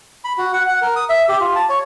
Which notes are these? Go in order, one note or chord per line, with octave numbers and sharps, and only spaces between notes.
B5
F#4
F#5
F#5
A#4
D#6
E5
G4
F4
A5
C#5